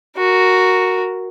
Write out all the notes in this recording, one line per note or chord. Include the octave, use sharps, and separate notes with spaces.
F#4 A#4